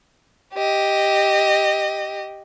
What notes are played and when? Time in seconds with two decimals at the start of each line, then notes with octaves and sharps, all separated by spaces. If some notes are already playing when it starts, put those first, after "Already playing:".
0.54 G4 D#5